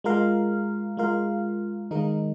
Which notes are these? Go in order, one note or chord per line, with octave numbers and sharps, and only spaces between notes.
G#3 F4 A#4 F5
G#3 F4 A#4 F5
D#3 G#3 D#4 A#4